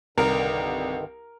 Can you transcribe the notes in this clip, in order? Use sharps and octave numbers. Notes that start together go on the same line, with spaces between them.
C2 G2 D3 D#3 A#4